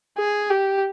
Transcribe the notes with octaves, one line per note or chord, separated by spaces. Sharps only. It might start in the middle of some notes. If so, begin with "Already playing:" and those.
G#4
G4